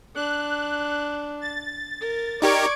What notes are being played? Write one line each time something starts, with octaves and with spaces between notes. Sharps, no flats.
D4 F#6
A6
A#4
D#4 G4 A#4 D5 C#6 G#6 D7